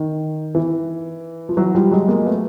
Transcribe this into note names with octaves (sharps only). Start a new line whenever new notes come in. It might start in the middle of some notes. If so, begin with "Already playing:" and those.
Already playing: D#3
E3
F3
E3 F#3
F3 G3
F#3 G#3
G#3 A#3
A3 B3